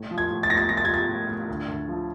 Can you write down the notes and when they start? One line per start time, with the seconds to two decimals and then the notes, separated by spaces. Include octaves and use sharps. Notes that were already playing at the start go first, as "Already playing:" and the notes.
Already playing: A2
0.11 F3
0.18 G#6
0.30 A2
0.43 A6
0.50 A2 A#6
0.57 A6
0.69 F3 A#6
0.77 A6
0.85 G#6
0.89 F3 A6
1.09 A2
1.28 A2
1.48 D2
1.68 D2
1.88 F3